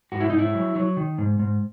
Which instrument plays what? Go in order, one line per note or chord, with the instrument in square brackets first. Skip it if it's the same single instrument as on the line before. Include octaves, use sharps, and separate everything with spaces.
[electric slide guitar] G#2 F#4
E4
G#2 D#4
E4
F#3
F#3
D#3
G#2
G#2